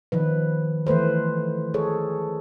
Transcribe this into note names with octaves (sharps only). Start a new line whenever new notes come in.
D#3 F3 B4
E3 A3 B4 C5
G#4 A4 C#5